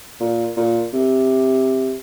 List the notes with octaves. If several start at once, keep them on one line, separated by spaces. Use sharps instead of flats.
A#2
A#2
C3